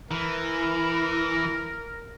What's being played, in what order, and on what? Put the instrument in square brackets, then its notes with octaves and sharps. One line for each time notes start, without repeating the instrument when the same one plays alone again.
[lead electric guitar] E3 [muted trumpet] A#4